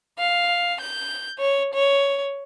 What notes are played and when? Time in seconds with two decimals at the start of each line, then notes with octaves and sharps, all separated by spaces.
0.18 F5
0.80 G6
1.38 C#5
1.73 C#5